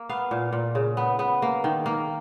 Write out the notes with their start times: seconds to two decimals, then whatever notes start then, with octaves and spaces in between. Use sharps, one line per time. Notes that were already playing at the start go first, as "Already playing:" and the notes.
Already playing: A#3
0.09 B3 F5
0.31 A#2
0.53 A#2
0.75 C#3
0.97 B3
1.19 B3
1.42 A#3
1.64 D#3
1.86 A#3